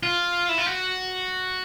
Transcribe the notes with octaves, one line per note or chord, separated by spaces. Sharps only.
F4
E4
F4
F#4